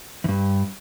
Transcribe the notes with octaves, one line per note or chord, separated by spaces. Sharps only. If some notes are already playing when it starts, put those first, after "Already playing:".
E2 G2